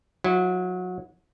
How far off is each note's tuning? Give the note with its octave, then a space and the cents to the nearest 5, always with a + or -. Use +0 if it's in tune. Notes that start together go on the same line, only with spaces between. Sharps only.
F#3 -25 E4 +0